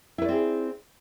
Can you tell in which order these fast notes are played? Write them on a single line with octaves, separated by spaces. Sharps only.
E4 B4 D5 C4 G#4